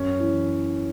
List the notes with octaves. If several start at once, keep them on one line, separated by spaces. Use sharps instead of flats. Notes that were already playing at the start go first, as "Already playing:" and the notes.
Already playing: F#2 C#4
E3